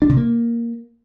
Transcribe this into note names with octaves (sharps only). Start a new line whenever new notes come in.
D4
C3
A#3